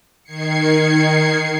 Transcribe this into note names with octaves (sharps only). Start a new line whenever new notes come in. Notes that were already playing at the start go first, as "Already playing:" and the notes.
D#3 G#6 C7 C#7